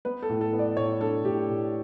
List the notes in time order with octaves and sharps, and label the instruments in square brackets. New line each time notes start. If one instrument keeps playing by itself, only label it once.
[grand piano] B3 B4
A4
A2
A4
B3
D5
A2 C#5
D4 A4
A2 G4
A2